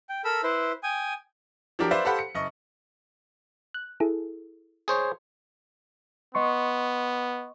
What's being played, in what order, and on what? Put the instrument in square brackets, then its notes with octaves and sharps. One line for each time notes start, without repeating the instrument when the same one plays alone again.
[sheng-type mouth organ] G5
A4 A#4 B5 E6
E4 B4 C5 E5
G5 G#5 D#6
[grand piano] F3 F#3 D4 G4 A#4
B4 C5 D5 E5 F5
G4 A4 C5 F5 F#5 B5
C#7
F#1 D#5 C#6
[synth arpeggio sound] F#6
E4 G#4 A4
[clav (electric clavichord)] G#4 C5 C#5
[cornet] B3 [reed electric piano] D#5 C6 C#6